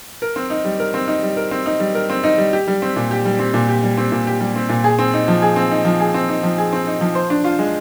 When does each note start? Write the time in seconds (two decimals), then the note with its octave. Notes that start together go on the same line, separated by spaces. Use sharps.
0.22 A#4
0.36 C4
0.50 D#4
0.65 G3
0.80 A#4
0.94 C4
1.08 D#4
1.23 G3
1.37 A#4
1.51 C4
1.66 D#4
1.80 G3
1.95 A#4
2.10 C4
2.24 D#4
2.38 G3
2.53 G4
2.67 G3
2.82 C4
2.96 A#2
3.11 G4
3.25 G3
3.39 C4
3.54 A#2
3.68 G4
3.83 G3
3.97 C4
4.12 A#2
4.27 G4
4.40 G3
4.56 C4
4.69 A#2
4.84 G#4
4.99 C4
5.14 D#4
5.28 F3
5.42 G#4
5.56 C4
5.71 D#4
5.85 F3
6.00 G#4
6.14 C4
6.29 D#4
6.43 F3
6.58 G#4
6.73 C4
6.87 D#4
7.01 F3
7.15 C5
7.30 D4
7.44 F4
7.59 G#3